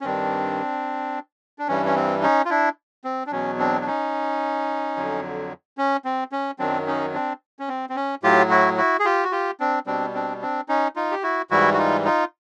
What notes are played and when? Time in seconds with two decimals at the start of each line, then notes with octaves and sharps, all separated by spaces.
0.01 C#4
0.04 G2 D#3 G3 C4 D4
1.59 D4
1.68 G2 E3 G3 C#4
1.86 C#4
1.96 C4
2.23 C#4 D#4
2.45 F4
2.50 D4 E4
3.04 C4
3.27 D4
3.32 E2 B2 F#3 C#4
3.59 C4 D4
3.81 D4
3.87 C#4 D#4
4.96 F2 D3 F#3
5.78 C#4
6.05 C4
6.32 C#4
6.59 F#2 D#3 F#3 C4 D4
6.87 C#4 D#4
7.14 C4 D4
7.59 C#4
7.69 C4
7.89 C4
7.96 C#4
8.23 A2 F#3 F4 G4
8.50 E4 F#4
8.78 E4 F#4
9.00 G#4
9.05 F4 G4
9.24 F#4
9.32 F4 G4
9.60 C4 D4
9.86 B2 G3 C4 D4
10.14 C4 D4
10.42 C4 D4
10.69 C#4 D#4
10.96 D#4 F4
11.11 G4
11.23 E4 F#4
11.51 G#2 E3 G3 E4 F#4
11.74 F#4
11.78 D#4 F4
12.05 D#4 F4